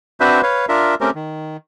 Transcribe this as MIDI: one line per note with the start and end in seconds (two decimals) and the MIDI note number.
0.20 0.41 60
0.20 0.41 62
0.20 0.41 66
0.20 0.41 71
0.20 0.41 72
0.20 0.41 76
0.43 0.66 71
0.43 0.66 73
0.43 0.66 77
0.69 0.95 62
0.69 0.95 65
0.69 0.95 70
0.69 0.95 76
1.01 1.10 57
1.01 1.10 60
1.01 1.10 61
1.01 1.10 67
1.01 1.10 70
1.15 1.57 51